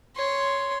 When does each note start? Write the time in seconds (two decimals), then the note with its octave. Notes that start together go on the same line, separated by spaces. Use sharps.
0.16 C#5 C6